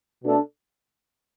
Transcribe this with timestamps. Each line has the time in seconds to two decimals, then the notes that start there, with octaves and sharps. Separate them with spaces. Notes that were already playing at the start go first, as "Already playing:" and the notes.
0.23 B2 A3 D4 A4